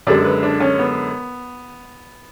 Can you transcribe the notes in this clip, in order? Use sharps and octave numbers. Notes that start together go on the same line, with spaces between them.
F#2 D3 G#3 D5
B4
D4
C#4
B3